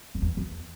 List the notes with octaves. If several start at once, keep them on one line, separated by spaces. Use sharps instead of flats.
F#2
E2
E2